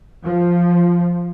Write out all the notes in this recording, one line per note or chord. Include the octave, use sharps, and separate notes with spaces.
F3